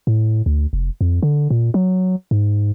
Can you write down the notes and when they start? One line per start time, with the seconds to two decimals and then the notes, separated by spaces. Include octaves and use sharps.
0.07 A2
0.46 D2
0.73 F1
1.01 F2
1.23 D3
1.50 A#2
1.74 F#3
2.31 G#2